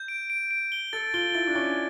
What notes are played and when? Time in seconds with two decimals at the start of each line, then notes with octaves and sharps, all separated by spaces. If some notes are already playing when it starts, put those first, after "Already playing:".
Already playing: G6
0.08 D7
0.30 D7
0.51 D7
0.72 G7
0.93 A4 A6
1.14 F4 G7
1.34 E4 A6
1.47 D4
1.55 C#4 G7